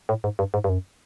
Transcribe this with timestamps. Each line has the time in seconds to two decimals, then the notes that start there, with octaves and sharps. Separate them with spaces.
0.09 A2
0.24 G#2
0.39 G2
0.54 G#2
0.64 G2
0.69 F#2